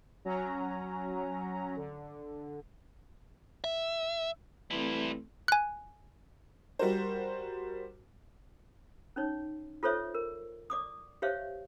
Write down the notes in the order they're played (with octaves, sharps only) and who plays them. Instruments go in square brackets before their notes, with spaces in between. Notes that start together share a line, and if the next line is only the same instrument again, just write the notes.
[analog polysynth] F#3 C#4 A#5
D3
[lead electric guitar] E5
[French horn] E3 [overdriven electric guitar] G3 E4 [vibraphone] A3 C4 A4
[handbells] G#5 F#6
[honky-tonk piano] G3 F#4 A#4 C5
[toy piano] C#4 D#4 C#5
F4 A4 C5 C#5 E5
A#4
D5 D6 D#6
G4 C5 C#5 E5 F5